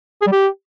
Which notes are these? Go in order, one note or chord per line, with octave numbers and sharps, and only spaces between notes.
G#4
G3
G4